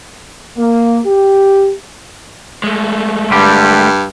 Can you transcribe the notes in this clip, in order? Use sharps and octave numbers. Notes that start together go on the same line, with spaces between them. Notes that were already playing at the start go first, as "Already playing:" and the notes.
A#3
G4
G#3 A3
G2 D3 G3 G4